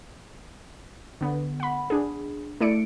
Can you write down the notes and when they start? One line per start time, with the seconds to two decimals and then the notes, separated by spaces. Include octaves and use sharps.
1.21 D3 B3
1.60 F#5 B5
1.90 D4 G#4
2.61 A3 E4 D5 C#7 D7